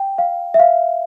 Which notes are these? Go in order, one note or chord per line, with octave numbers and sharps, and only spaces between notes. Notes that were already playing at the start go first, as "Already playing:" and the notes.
Already playing: G5
F5
E5
F5